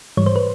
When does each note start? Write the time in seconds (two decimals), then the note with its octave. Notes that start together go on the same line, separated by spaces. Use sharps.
0.17 G#2 E3 G3 C#5
0.26 C5
0.36 B4